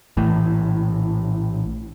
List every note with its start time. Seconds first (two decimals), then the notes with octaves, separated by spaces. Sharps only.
0.17 A#1 A2 E3